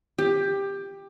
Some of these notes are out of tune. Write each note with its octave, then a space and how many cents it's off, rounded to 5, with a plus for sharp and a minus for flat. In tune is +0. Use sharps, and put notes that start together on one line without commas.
G4 +15